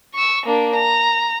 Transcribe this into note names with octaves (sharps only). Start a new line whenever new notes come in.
C#6 E6
A#3 D4
A#5